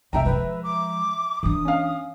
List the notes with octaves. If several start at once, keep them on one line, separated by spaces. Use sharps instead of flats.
E1 C2 E5 G5 A#5
F3 G#3 B4
D6
E3 D4 D#6
C#4 F5